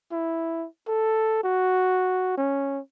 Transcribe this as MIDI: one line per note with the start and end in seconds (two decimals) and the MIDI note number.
0.11 0.67 64
0.88 1.43 69
1.43 2.37 66
2.37 2.80 61